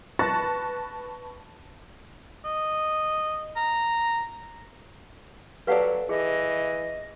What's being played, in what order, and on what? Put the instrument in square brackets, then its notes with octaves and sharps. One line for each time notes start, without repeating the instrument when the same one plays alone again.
[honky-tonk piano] B4 A5 C#6 F#6 A6 A#6
[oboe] D#5
A#5
[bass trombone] F#3 [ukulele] G4 A4 D5 [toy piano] B4 F5 F#5
[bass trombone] E3 [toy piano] G#4 [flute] D#5